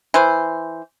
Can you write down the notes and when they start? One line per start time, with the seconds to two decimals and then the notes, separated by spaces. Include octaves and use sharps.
0.14 E3 C5